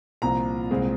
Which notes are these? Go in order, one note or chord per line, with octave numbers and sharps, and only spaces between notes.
C2 A#2 F3 C4 A#5
C2 A#2 G#3 C4